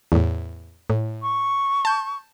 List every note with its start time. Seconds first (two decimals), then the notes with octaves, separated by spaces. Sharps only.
0.12 E2 A2
0.90 A2
1.22 C#6
1.85 A5 G6